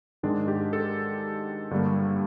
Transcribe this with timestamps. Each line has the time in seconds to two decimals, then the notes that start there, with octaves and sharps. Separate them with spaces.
0.23 G#2 D#3 G#3 D4
0.48 G4
0.73 A4
1.71 G2 D3 G3 A#3